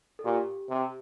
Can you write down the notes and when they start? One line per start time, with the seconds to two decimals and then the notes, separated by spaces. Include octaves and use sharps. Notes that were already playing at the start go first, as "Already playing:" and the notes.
0.19 A4
0.25 A#2 G4
0.69 C3